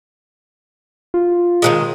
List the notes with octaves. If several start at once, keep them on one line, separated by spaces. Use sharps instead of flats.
F4
D#3 E3 G#3